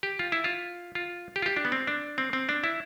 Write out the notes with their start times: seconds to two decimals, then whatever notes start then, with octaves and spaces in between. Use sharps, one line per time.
0.03 G4
0.19 F4
0.32 E4
0.44 F4
0.95 F4
1.36 G4
1.42 F4
1.46 G4
1.57 D4
1.65 B3
1.72 C4
1.87 D4
2.18 C4
2.33 C4
2.49 D4
2.64 E4